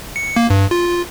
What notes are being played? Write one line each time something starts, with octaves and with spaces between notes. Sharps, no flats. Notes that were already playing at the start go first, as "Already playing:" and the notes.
C#7
A#3
G2
F4